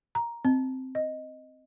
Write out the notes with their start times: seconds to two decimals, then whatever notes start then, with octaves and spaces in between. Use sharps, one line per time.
0.15 A#5
0.45 C4
0.95 D#5